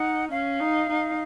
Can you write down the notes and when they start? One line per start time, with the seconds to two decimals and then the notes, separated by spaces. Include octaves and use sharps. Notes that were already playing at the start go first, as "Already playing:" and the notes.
Already playing: D#4 F#5
0.31 C#4 F5
0.60 D#4
0.89 D#4